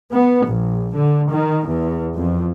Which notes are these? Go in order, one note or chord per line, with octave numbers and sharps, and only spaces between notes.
B3
A#1
D3
D#3
E2
F2